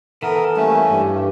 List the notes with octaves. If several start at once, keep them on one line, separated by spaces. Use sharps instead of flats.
E3 B3 A4 A#4
G3 A3 A#3 C#4
G2 G4